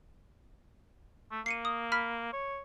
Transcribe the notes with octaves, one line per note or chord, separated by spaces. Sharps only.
A3
A#3 C7 C#7 D#7
D#6
B5 F6 B6
C#5